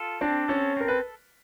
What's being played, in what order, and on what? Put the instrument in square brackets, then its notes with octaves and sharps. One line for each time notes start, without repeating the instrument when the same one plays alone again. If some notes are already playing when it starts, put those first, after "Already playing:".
Already playing: [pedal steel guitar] F4 A4
[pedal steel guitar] C4 [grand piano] D4 D5
[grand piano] C#4 C#5 [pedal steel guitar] A4
[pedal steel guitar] C4 [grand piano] A#4
[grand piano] B4